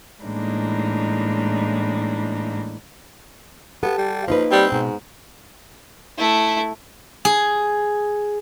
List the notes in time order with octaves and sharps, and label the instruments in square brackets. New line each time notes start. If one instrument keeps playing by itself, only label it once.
[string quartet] A2 E3 G#3 A#3 D4 D#4
[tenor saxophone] B3 [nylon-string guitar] G4 A4
[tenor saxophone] G3
[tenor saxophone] F3 [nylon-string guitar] A#3 D#4 B4
[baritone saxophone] G3 [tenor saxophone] C4
[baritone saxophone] G#2 [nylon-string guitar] B2
[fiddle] A3 E4
[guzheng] G#4